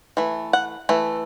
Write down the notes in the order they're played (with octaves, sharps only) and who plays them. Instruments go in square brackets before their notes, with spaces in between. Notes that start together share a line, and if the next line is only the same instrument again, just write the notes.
[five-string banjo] E3 A3
F#5
E3 A3